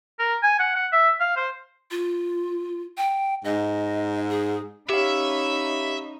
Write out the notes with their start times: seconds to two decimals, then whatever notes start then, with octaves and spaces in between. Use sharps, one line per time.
0.19 A#4
0.43 G#5
0.59 F#5
0.75 F#5
0.92 E5
1.20 F5
1.36 C5
1.91 F4
2.97 G5
3.44 G#2 D#5
4.30 G#4
4.89 C#4 D#4 G4 C#5 E5 F5 B5